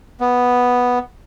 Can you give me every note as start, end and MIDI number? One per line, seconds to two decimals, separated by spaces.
0.20 0.99 59